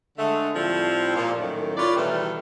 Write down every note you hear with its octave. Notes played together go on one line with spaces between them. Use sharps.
D3 G#3 A3
A2 F3 G3 C4
A#2 F3
F#2 A2 D#3
F4 B4 C#5 D5
B2 D#3 E3 G3 A3 B3